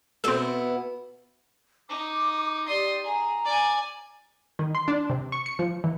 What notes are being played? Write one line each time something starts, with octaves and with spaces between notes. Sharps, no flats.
B2 B3 C4 E4 A4
D#4 D6
G4 D5 C6 D#6
G#4 A#5
D5 G#5
D#3
C6
D4
C3
C#6
C#7
F3
E3